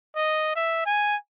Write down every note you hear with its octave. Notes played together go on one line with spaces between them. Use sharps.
D#5
E5
G#5